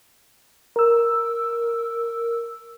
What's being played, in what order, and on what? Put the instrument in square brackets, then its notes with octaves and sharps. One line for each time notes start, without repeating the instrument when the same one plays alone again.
[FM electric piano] A#4 E6